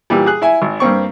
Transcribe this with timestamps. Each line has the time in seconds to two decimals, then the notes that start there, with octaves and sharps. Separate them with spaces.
0.10 A#2 E3 G3
0.26 G#4 F#6
0.42 E4 E5 G#5
0.62 G#1
0.80 G2 A#3 C4 C#6